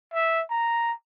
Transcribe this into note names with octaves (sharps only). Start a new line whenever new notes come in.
E5
A#5